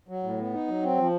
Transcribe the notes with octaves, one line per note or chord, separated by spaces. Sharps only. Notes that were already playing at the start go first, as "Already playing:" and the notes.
F#3
A2
B3
D#4
F#3
C4
F3